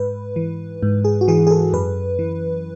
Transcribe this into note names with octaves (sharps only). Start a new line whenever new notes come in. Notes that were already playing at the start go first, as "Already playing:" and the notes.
Already playing: G#2 B4
E3
G#2
G#4
F#4
E3 G#4
G#4
A4
F#2 B4
E3